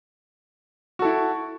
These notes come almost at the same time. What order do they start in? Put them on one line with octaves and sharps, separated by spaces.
F#4 A4 E4